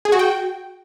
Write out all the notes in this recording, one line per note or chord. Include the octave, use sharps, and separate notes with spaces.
G#4
F#4
G5